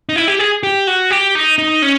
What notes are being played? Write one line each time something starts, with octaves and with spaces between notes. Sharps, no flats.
D#4
E4
G4
G#4
G4
F#4
G4
D#4
D#4
C#4